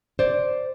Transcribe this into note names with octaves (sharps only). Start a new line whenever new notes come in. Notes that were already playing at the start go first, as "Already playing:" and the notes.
C5 D5